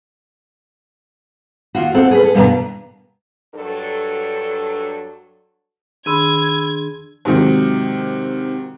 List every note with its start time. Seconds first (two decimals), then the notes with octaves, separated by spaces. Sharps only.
1.75 D#2 F4 F#4
1.94 C4 A4 F#5
2.11 G#4 B4
2.23 A4
2.35 G2 B2 D#3 B3 D4 A#5
3.55 G2 F#3 D4 A4
6.06 D#3 D4 G#4 B5 C6 E6 G#6 D#7
7.25 G#2 C3 D#3 F#3